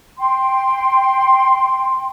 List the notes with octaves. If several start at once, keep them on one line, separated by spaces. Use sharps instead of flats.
G5 C6